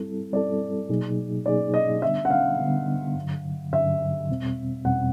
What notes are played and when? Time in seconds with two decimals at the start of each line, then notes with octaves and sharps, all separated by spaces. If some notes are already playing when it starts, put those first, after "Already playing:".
Already playing: G3 C4 E4 A4
0.33 G3 C4 E4 A4 D5
0.89 B2 F#3 A#3 D#4 G#4
1.46 B2 F#3 A#3 D#4 G#4 D5
1.74 D#5
2.02 D3 G3 B3 D4 E5
2.25 F#5
2.30 F5
2.59 D3 G3 B3 D4
3.15 G2 D3 F#3
3.72 G2 D3 F#3 E5
4.29 E2 B2 G3 C4
4.85 E2 B2 G3 C4 F#5